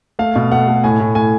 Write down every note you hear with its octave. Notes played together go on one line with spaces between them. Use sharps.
A3 F5
B2
A3 F#5
A3
A2 G#5
A2
A2 G#5